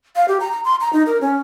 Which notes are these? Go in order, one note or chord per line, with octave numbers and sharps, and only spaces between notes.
F5
G4
A#5
A#5
C6
A#5
D#4
A#4
C#4